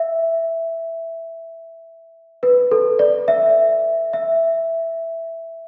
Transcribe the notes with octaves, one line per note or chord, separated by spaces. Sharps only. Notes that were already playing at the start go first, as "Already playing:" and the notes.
Already playing: E5
B4
A4
D5
E5
E5